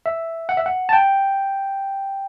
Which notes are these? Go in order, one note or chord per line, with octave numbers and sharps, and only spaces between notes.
E5
F#5
E5
F#5
A5
G5